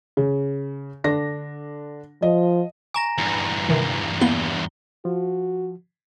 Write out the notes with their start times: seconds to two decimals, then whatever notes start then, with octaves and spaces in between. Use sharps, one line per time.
0.17 C#3
1.04 D3 D4 A#6
2.22 F3 D#5
2.94 G#5 A#5 C#6 A#6
3.18 E2 G2
3.69 C3 D#3 E3
4.21 A#3 B3 E4 G7
5.05 F3 F#4